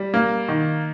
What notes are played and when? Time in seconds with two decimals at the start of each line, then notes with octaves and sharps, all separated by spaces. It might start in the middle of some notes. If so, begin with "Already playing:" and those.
Already playing: G3
0.14 A#3
0.49 D#3